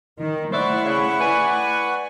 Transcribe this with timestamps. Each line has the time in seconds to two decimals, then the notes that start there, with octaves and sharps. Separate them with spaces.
0.19 D#3 A#4
0.52 A3 E4 C5 D5 E5 F#5 B5 C#6
0.85 C#3
1.19 B4 D5 G#5